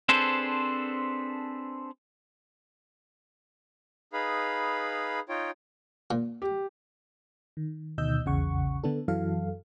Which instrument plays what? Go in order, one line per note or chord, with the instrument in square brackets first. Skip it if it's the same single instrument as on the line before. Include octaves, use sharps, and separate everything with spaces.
[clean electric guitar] C4 D4 G#4 A4 B4 C5
[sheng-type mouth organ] D#4 G#4 B4 F5 B5
D#4 F4 C#5 G5
[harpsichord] A#2
[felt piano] G4
[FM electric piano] D#3
D2 B2 D#3 D#5 E6 G6
A#1 E2 C#3 F#5 C#6
D3 B3 D4 A4
F#2 E3 F#3 A4 F5